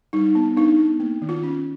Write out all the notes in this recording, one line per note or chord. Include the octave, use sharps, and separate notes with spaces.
G3 D#4
B3
D4 D#4
B3
A#3
D#3
F4
C#4